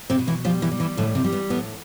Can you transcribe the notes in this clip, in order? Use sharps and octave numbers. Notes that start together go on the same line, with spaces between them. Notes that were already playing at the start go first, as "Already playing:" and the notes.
C3 C4
B2
E3 E4
F3 G3 F4
E3 E4
G3
E3 E4
A2 D3 D4
C3 C4
G3
B3
A2 B3